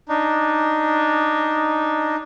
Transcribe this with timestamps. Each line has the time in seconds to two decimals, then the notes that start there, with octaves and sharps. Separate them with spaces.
0.09 D4 D#4